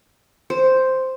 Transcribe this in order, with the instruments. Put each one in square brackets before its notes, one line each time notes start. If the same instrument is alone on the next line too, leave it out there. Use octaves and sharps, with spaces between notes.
[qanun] C5